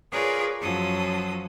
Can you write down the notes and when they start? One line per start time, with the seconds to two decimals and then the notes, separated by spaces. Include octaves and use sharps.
0.11 F4 G#4 A#4 B4 C#5 D5
0.60 F#2 F3 F#3 A4 D#6